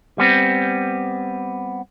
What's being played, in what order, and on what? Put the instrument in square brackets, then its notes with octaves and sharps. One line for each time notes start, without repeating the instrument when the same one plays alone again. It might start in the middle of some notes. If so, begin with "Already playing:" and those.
[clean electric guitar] G3 B3 C4